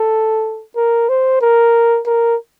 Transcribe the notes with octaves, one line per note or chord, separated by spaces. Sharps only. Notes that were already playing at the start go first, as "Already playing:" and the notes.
Already playing: A4
A#4
C5
A#4
A#4